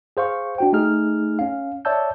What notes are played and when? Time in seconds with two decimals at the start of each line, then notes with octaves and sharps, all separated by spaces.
0.17 G#4 C5 F5 C#6
0.58 D4 F#4 G5
0.73 A3 D#4 G#4 F6
1.39 C#4 F5
1.85 C#5 D5 E5 A5 E6 G6